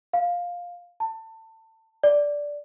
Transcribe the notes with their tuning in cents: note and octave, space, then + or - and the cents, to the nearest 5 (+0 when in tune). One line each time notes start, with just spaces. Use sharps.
F5 +10
A5 +25
D5 -5